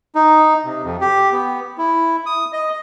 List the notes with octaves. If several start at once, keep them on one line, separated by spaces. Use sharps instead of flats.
D#4
C3
F2
G4
B3
E4
D#6
D#5